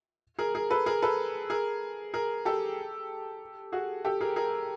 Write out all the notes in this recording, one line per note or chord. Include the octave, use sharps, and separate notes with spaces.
G#4 A#4
G#4 A#4
A4 B4
G#4 A#4
A4 B4
G#4 A#4
G#4 A#4
G4 A4
F#4 G#4
G4 A4
G#4 A#4
G#4 A#4